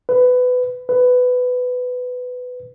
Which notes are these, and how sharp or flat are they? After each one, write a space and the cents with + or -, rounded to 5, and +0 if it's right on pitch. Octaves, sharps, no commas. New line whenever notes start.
B4 +20
B4 +15